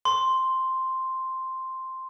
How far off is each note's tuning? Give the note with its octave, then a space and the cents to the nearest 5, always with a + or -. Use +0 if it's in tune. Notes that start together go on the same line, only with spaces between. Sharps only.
C6 +0